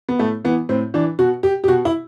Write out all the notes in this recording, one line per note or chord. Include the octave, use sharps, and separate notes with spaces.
B3
A2 A3
E3 B3
A2 C4
E3 D4
B2 F#4
G4
G4
B2 F#4
E4